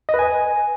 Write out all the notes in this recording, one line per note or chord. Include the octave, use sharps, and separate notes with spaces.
D#5
B4
G#5